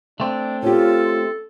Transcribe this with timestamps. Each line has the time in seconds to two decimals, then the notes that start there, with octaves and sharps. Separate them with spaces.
0.20 A3 C4 D4
0.63 C#4 F4 G4 A4